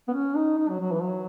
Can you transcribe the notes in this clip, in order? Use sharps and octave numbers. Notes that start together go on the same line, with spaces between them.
B3
C#4
D#4
D#4
F#3
F#3
E3
F#3